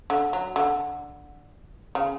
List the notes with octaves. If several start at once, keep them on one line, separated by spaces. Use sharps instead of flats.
D3
F#3
D3
C#3